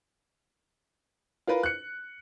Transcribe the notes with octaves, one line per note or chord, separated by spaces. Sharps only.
F4 A#4 B4
F#6 C#7